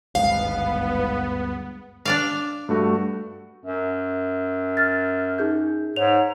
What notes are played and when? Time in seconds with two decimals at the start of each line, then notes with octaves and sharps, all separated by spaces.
0.15 G#1 D2 G2 G#3 B3 F5
2.05 D4 D5 F5
2.69 G2 A3 F#4
3.64 F#2
4.77 F6 A6
5.38 D#4 G#4 G6
5.96 G#2 C#5 F7